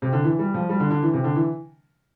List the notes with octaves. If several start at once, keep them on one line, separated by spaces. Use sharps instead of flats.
C3
D3
E3
G3
F3
G3
D3
D3
E3
C3
D3
E3